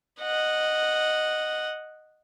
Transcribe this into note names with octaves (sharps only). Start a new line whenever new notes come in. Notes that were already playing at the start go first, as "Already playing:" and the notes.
D#5 F#5